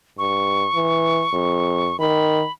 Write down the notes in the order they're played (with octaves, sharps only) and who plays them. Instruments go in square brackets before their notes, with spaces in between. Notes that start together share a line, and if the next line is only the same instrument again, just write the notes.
[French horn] G2 [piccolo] C#6
[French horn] E3
F2
[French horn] D#3 [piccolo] B5